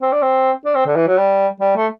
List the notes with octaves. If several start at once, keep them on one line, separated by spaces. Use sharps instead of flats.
C4
D4
C4
D4
C4
D3
E3
F#3
G3
G3
A3